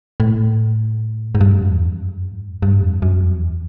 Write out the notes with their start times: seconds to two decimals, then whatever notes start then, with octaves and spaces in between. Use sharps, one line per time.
0.20 A2
1.35 G#2
1.41 G2
1.56 F#2
1.71 E2
1.86 F2
2.02 F#2
2.32 G#2
2.62 G2
2.82 F2
3.02 F#2
3.22 F2
3.37 E2